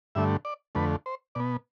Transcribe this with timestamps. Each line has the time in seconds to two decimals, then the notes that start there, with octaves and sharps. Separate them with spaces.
0.15 G2 D3 A3 E5
0.45 D5
0.75 F2 D3 A3 B4
1.06 C5
1.35 B2 B3 D5